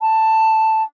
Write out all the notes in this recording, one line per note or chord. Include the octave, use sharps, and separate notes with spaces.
A5